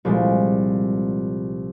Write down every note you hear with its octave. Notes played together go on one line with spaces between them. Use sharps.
C2 A#2 F3 G#3